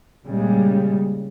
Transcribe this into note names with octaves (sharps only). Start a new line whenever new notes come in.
A#2 C#3 G3 G#3